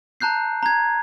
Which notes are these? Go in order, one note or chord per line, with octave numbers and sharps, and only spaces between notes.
A5 A#5 F#6 G6 C7
A#5 G#6